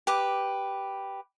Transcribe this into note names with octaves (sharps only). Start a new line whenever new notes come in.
G4 B4 D6